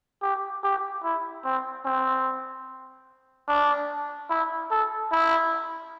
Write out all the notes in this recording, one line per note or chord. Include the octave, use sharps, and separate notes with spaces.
G4
G4
E4
C4
C4
D4
E4
A4
E4